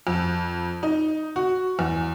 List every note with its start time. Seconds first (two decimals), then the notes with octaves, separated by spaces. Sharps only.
0.07 F2
0.83 D#4
1.36 F#4
1.79 E2